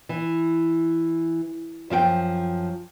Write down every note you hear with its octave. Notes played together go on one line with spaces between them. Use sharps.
E3
F#2 F3 F#4 G5